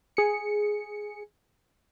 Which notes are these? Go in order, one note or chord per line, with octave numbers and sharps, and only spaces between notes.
G#4 C#7